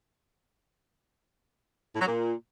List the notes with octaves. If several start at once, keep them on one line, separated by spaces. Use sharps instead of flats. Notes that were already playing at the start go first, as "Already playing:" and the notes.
A2
F#3
A#2